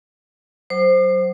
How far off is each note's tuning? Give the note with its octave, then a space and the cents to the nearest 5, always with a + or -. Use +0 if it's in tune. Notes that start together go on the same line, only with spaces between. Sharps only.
F#3 +25 C5 +0 D6 +45